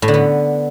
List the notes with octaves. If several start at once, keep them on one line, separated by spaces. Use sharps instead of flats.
A2
D3
B3